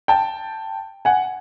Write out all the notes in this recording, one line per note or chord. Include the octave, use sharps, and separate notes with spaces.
G5 A5
F#5 G#5